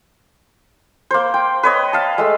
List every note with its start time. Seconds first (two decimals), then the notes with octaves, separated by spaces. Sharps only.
1.11 A#3 C5
1.34 G5
1.63 B4 C#5 D#5
1.93 F5 A5
2.18 G#3 A3